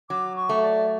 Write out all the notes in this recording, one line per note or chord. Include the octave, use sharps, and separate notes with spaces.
F#3 D6
C#6
A3
D5